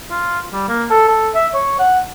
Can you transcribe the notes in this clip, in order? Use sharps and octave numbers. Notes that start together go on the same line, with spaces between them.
F4
G3
A#3
A4
A4
E5
C#5
F#5